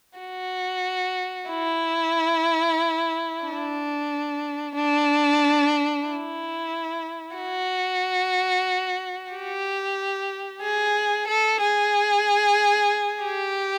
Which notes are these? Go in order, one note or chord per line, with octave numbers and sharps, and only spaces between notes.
F#4
E4
D4
D4
E4
F#4
G4
G#4
A4
G#4
G4